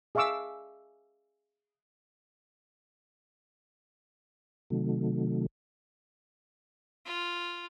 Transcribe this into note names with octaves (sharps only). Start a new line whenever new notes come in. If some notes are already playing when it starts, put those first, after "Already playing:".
G#4 E5 F5 C#6 D6 E6
C3 D#3 F#3 A3
F4